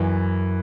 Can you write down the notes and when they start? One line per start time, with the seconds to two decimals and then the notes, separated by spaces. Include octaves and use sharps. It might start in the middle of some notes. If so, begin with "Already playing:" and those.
Already playing: F#2 E3